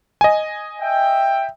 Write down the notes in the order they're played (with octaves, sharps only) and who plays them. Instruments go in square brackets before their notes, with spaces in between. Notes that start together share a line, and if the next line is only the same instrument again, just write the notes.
[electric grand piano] D#5 G#5
[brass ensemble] E5 G5